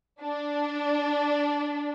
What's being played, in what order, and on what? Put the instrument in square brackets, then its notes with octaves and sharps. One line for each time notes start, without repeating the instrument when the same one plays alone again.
[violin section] D4